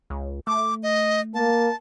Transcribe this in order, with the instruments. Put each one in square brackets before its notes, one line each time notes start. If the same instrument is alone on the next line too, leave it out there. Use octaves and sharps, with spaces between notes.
[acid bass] C#2
[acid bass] A3 [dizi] D6
[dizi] D#5
[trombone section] A#3 [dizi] A5